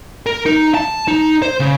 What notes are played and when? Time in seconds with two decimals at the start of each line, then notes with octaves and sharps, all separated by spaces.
0.26 A#4
0.46 D#4
0.75 A5
1.08 D#4
1.42 C5
1.60 C#3